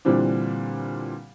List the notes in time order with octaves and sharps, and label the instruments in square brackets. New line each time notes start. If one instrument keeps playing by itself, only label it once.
[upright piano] A#2 D3 E3 G3 C4 D4